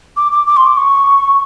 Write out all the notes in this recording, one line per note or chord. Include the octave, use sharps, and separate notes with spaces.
D6
D6
D6
C6
D6
C#6